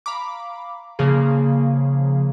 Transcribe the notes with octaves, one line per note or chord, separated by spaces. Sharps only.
F5 A#5 B5 D6
C#3 F3 A#3 G#4